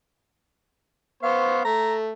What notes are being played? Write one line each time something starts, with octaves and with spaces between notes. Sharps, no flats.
B3 C5 F5 C#6
A3 A#5